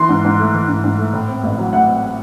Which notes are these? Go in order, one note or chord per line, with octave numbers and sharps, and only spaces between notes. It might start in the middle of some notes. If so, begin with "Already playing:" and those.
Already playing: E3 C6
G#2
G#2
A3
E3
G#2
G#2
A3
A2
C4
A1
F#3
A2 F#5
C4